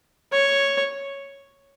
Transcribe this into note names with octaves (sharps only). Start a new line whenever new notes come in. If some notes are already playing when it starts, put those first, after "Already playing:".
C#5